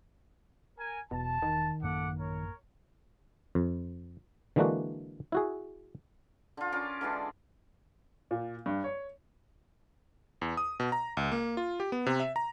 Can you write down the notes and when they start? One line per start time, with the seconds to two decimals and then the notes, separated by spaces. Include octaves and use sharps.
0.78 A#4 G#5
1.11 E1 B2 A5
1.42 D#3
1.82 A1 F#2 A#3 A4 F#5 D6
2.18 A#4 C#5
3.55 F2
4.56 D3 E3 G#3 A#3 D4 F#4
5.32 E4 F#4 G#4
6.57 D3 F4
6.72 C#4 F4 A#4 D5
7.01 D3 E3 G#3 D4
8.31 A#2
8.66 G2
8.84 C#5
10.41 E2
10.57 D#6
10.80 B2
10.92 A#5
11.17 C#2
11.32 A#3
11.57 F4
11.80 G4
11.92 B3
12.06 C3
12.20 E5
12.36 A#5